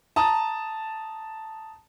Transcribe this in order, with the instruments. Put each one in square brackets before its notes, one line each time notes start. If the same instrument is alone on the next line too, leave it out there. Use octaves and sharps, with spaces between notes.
[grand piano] A5 A#5 D#6